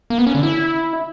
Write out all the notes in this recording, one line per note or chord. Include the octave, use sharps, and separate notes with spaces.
A#3
B3
C#4
D3
E4